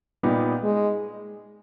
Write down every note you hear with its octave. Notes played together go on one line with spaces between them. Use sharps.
A#2 G3 B3 D#4 G4
G#3